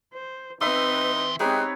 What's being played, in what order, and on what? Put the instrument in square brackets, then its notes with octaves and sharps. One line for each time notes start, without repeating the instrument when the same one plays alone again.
[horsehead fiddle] C5
[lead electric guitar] E3 C6 [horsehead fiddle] C4 B4 [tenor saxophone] D#4 [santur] E5 B5
[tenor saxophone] G#3 [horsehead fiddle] C4 C#5 [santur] D#4 G4 B4